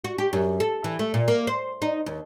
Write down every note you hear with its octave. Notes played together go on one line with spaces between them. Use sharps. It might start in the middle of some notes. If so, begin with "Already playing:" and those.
F#4
G4
F#2
A4
E3
A3
A#2
A#3
C5
D#4
D#2